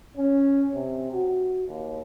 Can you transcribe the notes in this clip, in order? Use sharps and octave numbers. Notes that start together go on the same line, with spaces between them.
C#4
C3
F#4
D#2